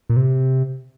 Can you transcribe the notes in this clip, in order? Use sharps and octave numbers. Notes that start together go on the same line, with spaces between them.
A#2
C3